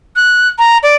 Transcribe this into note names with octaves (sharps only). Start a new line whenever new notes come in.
F#6
A#5
D5